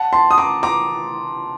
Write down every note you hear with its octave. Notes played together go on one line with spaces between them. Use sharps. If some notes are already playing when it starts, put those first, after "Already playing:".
Already playing: F#5 A5
A5 C6
D#6
A#5 D6
A#5 D6